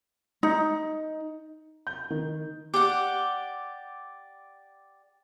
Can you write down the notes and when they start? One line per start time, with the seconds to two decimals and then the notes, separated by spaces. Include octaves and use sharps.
0.43 D#4
1.87 G6
2.10 D#3
2.74 G4 D5 F#5